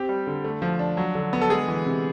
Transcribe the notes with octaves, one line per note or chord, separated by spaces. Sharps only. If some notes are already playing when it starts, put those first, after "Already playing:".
Already playing: C4 G4
G3
D3
A3
F3
D4
F#3
D3
B3
A4
G#3 G#4
E3
C3